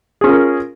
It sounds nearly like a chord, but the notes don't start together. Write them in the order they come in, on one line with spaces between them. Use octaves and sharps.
G#4 C#4 F4 A#4